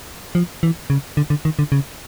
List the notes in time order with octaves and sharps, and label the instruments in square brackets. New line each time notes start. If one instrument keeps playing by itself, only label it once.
[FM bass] F3
E3
C#3
D3
D3
D#3
D3
C#3